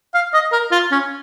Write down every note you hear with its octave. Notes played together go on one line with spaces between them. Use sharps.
F5
D#5
A#4
F4
C#4